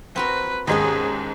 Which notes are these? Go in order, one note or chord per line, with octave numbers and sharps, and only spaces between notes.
C4 F#4 A#4 B4
D#2 G#2 D#3 G#3 B3 C#4 G#4